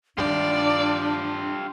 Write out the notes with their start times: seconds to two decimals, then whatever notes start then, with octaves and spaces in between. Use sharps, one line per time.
0.18 G2 D#3 D4 F4 G4 D5